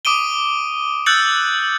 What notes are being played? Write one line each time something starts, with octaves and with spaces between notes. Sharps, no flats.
D6 D#6 D7 D#7 G7
E6 F#6 G6 A6 C#7 F#7